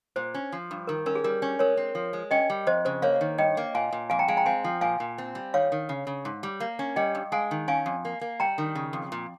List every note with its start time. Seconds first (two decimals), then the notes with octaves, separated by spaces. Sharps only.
0.16 A#2 C5
0.34 C#4
0.52 F3
0.71 G2
0.87 D#3 A#4
1.06 C#4 A#4
1.15 G#4
1.24 G3 A#4
1.42 C#4
1.59 G#3 A#4 C#5
1.77 C4
1.95 F3
2.13 G#3
2.31 C#4 D#5 G5
2.50 G3
2.67 F2 C5 D#5
2.85 C#3 C5
3.02 A#3 C#5 F5
3.21 D#3
3.38 G2 D#5 G5
3.57 A#3
3.75 A#2 F5 G#5
3.92 A#2
4.10 F2 F5 G#5
4.19 G5 A#5
4.28 G#3 F5 G#5
4.37 G5 A#5
4.46 C4 F5 G#5
4.64 F3
4.81 A#2 F5 G#5
5.00 A#2
5.18 C4
5.35 G3
5.54 D#3 C#5 F5
5.72 D#3
5.89 C#3
6.07 C#3
6.25 G#2
6.43 G3
6.60 A#3
6.79 C#4
6.96 G3 D#5 G5
7.15 G2
7.32 G#3 F5 G#5
7.51 D#3
7.68 C#4 F5 G#5
7.86 F2
8.05 A#3
8.21 A#3
8.40 G3 G5 A#5
8.58 D#3
8.75 C#3
8.93 F2
9.12 A#2